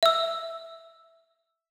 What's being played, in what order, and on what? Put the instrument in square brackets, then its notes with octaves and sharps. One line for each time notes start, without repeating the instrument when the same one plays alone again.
[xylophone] E5 E6